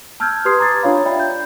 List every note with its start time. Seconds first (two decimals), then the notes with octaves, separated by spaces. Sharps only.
0.20 A5 E6 F6 G6 G#6
0.45 G4 B4 C6 D#6 G#6 C7
0.59 A#5 D6 D#6 G#6 A6
0.82 D4 F4 C#5 F5 B5
1.05 D5 E5 G5 B5
1.20 G6